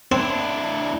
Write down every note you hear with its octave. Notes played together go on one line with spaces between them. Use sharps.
C4 D4 E4